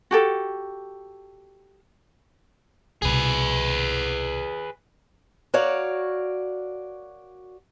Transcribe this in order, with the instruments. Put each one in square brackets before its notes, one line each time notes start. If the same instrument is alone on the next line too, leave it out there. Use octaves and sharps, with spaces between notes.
[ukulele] F#4 G4 A4
[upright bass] C2 B2 [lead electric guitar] G#4 B4
[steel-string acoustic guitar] F#4 A#4 C#5 D5 F5